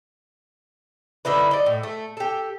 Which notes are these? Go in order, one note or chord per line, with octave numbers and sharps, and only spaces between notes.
D3 D#4 E4 B4
D5 D#5
A2
A3
G4 A4